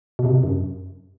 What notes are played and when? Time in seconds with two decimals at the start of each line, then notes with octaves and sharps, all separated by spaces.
0.19 B2
0.25 C3
0.43 F#2